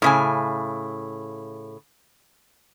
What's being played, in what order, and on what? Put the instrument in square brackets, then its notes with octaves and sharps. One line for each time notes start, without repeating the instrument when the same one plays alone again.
[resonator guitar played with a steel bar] A2 C#3 G#5